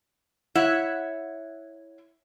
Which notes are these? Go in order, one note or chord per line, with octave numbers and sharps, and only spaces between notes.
E4 C#5 E5 F#5